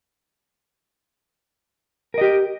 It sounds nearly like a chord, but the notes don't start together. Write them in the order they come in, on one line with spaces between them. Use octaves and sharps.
A#4 D#5 G4